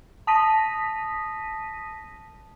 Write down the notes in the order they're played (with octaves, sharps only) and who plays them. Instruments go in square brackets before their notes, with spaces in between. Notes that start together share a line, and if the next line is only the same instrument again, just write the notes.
[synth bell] A5 D#6 A#6 B6 D#7